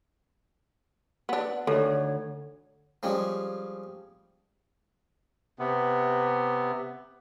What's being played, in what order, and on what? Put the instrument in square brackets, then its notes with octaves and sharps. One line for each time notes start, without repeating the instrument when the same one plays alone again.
[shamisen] B3 D4
[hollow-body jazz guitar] D2 [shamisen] D#3 [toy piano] A4 [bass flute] C#5
[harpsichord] F3 G3 G#3 C#4
[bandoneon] C3 B3